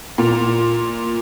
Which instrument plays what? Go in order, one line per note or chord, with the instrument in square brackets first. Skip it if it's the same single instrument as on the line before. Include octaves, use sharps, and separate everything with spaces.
[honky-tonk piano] A#2